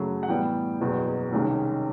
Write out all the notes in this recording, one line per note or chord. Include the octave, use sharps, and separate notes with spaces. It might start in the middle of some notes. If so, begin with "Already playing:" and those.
Already playing: F#2 C#3 F#3 A3
F#5
A2 E3 G3 B3 G5
F#1 E2 B2 F#3
C2 C3 D#3 G#3 C#4